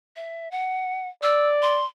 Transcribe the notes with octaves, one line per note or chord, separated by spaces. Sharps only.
E5
F#5
D5 E6
C6